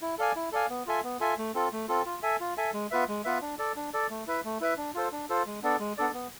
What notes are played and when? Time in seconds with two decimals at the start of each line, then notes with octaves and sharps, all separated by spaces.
0.02 E4
0.18 A4 D5 F5 G#5
0.36 E4
0.52 A4 D5 F5 G#5
0.69 B3
0.87 F4 A4 E5 G#5
1.04 B3
1.20 F4 A4 E5 G#5
1.38 A3
1.54 C4 F4 A4
1.72 A3
1.88 C4 F4 A4
2.06 F4
2.23 A4 E5 G#5
2.40 F4
2.57 A4 E5 G#5
2.73 G#3
2.91 B3 F4 B4 E5
3.08 G#3
3.24 B3 F4 B4 E5
3.41 D4
3.59 A4 D5
3.76 D4
3.94 A4 D5
4.10 A3
4.27 E4 B4 E5
4.44 A3
4.61 E4 B4 E5
4.77 D4
4.94 F4 A4 C5
5.12 D4
5.30 F4 A4 C5
5.46 G#3
5.63 B3 D4 A4 D5
5.79 G#3
5.98 B3 D4 A4 D5
6.14 B3